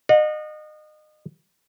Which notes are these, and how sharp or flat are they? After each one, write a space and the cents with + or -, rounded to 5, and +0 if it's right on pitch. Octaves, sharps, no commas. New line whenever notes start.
D#5 -30 F#5 -40